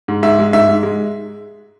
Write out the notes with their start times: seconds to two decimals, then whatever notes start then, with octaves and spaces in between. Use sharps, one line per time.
0.08 G#2
0.23 G#2 E5
0.39 G#3
0.53 G#2 E5
0.69 G#2
0.83 G#3